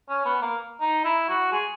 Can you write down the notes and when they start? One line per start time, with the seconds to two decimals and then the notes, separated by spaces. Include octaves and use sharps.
0.09 C#4
0.25 B3
0.42 A#3
0.81 D#4
1.05 E4
1.29 F#4
1.52 G#4